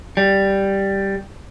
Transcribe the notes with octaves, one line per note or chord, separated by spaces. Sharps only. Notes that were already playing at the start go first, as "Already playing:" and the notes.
G3